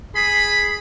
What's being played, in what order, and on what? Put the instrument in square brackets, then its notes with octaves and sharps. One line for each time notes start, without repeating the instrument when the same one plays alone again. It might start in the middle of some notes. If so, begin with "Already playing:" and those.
[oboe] G#4 [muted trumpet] B5 [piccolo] B6